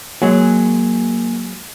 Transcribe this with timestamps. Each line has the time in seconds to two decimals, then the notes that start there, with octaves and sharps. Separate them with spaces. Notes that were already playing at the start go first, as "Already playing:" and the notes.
0.22 F#3 G#3 A#3 G#5